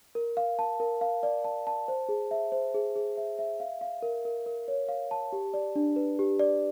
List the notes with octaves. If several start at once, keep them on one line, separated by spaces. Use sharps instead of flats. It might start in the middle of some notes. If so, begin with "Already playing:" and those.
A#4
F5
A5
A#4
F5
D5
A5
A5
C5
G#4
E5
C5
G#4
G#4
E5
E5
F5
F5
A#4
A#4
A#4
C#5
F5
A5
G4
D5
D4
B4
G4
D5